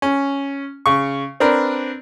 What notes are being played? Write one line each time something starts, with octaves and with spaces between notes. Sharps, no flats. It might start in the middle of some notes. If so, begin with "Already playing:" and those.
C#4
C#3 C#6
C4 D4 A#4 B4